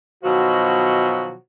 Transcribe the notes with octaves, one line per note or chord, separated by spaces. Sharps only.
B2 D#3 F3 F#3 F#4